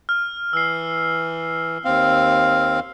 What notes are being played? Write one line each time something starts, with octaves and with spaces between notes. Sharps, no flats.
F6
E3 E6 C7
D#2 C4 F5